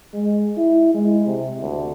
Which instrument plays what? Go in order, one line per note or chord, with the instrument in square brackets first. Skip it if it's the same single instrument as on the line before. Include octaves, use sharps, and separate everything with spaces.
[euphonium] G#3
E4
G#3
C3
D2